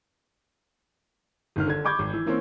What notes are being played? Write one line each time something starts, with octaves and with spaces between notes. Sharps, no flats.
G1 D#3 F6
D3 G#6
B5 C#6 D6 G6 G#6
G#1
E3
E3 A#3 C4 C#4